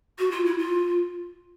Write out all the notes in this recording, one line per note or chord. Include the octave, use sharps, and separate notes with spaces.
F#4
F4
E4
F4